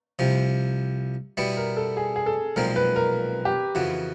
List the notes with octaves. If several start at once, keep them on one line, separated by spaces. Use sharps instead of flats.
C2 C3 F3
B2 G3 B3 E4
A#4
A4
G#4
G#4
A4
B1 A#2 F3 G#3 C4 A#4
B4
A#4
G4
F2 C#3 E3 F#4